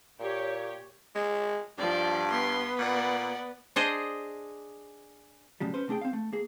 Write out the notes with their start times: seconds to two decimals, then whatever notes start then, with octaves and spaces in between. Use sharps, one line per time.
0.19 A#2 G4 C#5
1.15 G#3
1.78 G2 F3 D5
2.31 B3 C6
2.79 A#2 D5 F#5
3.76 D4 G#4 C5 D#5
5.60 A2 C#3 F#3 G3
5.74 C#4 B4 C5
5.88 C3 A3 D4 G#4 G5
6.01 C4 F5
6.13 A3
6.33 A#3 G#4